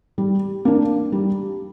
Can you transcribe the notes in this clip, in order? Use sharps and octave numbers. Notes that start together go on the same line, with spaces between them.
G3
A#3 D4
G3